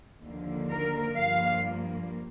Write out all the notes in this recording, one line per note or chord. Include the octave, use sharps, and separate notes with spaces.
D#2 D3 F3 A#3
A#4
G2 F3 A#3 F5